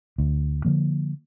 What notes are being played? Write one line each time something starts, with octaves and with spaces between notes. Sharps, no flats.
D2
D3 F3 A#3